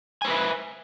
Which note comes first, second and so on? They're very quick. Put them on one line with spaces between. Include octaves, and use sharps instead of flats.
G#5 C5 B4 E5